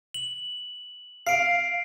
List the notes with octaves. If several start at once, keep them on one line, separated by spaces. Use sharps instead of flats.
F#7
F5 C7 D7